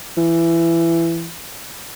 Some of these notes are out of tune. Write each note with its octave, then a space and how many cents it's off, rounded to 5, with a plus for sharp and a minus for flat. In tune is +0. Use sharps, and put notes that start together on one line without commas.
E3 +20